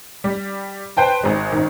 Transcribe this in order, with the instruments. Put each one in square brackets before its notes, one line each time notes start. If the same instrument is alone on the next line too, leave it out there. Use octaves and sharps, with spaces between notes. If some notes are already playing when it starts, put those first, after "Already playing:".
[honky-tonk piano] G3
B4 C5 G5 A5
G#1 G#3
G#1 D#3